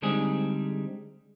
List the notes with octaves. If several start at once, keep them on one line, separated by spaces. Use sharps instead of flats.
D3 G3 G#3 C4 D#4 G#4